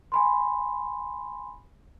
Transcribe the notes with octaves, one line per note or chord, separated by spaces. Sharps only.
G#5 B5 C6